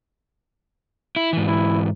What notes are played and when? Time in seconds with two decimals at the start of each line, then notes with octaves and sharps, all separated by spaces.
1.16 E4
1.33 G#2 E3
1.48 E4